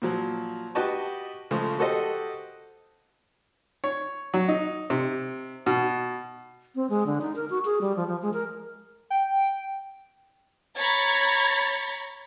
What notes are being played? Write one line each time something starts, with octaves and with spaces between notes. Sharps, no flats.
A#2 F3 F#3
F#4 G4 B4 D#5 A5 C#6
C#3 F3 G#3 A3
F#4 G4 A4 C5 D#5 F#5
C#5
F#3
D#4
C3
B2
C4
G#3
D3
D#4
A#4
F#4
G#4
G3
F3
F3
G#3
A#4
G5
C#5 A#5 B5 G#6 A6 C#7